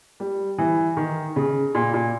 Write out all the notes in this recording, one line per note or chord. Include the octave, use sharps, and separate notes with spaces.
G3
E3
D#3
C#3
A#2
A#2